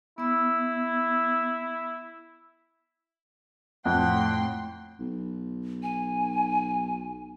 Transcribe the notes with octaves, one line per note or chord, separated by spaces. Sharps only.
B3 E4 E6
F2 A2 F#5 G5 C6
B1
G#5